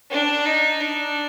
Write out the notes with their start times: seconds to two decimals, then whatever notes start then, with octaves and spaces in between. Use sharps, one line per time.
0.11 D4
0.45 D#4
0.80 D4